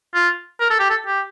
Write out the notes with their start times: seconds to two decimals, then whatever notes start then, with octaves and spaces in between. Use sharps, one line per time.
0.14 F4
0.60 A#4
0.70 A4
0.79 G4
0.90 A4
1.07 G4